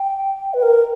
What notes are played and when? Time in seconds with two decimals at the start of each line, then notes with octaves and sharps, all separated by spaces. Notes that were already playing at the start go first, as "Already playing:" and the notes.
Already playing: G5
0.54 B4
0.63 A#4